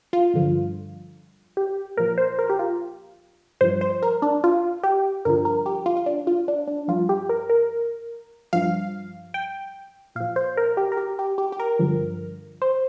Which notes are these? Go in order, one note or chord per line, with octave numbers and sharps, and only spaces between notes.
F4
G2 D3 F3
G4
A#2 F3 A#4
C5
A#4
G4
F4
G2 F3 C5
C5
A#4
D4
F4
G4
G2 D3 F3 A#4
A#4
G4
F4
F4
D4
F4
D4
D4
G2 F3 F4
G4
A#4
A#4
G2 F3 F5
G5
A#2 F3 F5
C5
A#4
G4
A#4
G4
G4
G4
G4
A#4
G2 D3 F3
C5